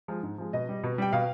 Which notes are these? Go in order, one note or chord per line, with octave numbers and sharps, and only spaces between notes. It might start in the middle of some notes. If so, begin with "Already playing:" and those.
F3 G#3
G#2
F3 G#3
B2 D#5
G3
B2
G3 G5
B2 F5